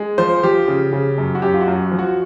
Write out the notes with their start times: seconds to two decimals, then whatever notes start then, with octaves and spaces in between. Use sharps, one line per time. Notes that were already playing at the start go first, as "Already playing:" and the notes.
Already playing: G#3
0.18 F3 C5
0.43 F3 G4
0.68 C#3
0.93 C#3
1.18 F#2
1.35 F#4
1.42 F#2 G4
1.54 F4
1.61 F#4
1.68 F#2
1.92 F3
1.99 F#4